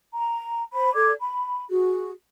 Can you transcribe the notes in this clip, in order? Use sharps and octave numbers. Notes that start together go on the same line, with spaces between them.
A#5
C5 B5
A4 D5 D6 G#6
B5
F#4 G#4